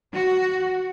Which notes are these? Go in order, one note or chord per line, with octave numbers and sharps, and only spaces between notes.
F#4